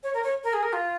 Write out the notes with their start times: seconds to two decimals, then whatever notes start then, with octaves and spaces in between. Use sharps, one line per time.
0.03 C#5
0.14 A#4
0.23 C#5
0.44 A#4
0.53 G#4
0.63 A#4
0.73 F4